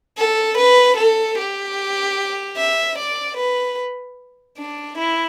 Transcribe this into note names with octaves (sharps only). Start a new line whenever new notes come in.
A4
B4
A4
G4
E5
D5
B4
D4
E4